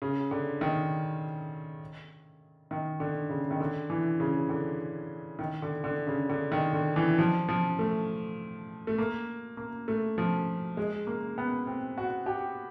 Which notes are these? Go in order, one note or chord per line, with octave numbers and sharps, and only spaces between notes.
C#3
D3
D#3
D#3
D3
C#3
D#3
D3
E3
C#3
D3
D#3
D3
D3
C#3
D3
D#3
D3
E3
F3
F3
A3
A3
A#3
A#3
A3
F3
G#3
A#3
B3
C4
F#4
G4